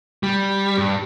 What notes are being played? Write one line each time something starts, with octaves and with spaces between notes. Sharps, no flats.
G3
G2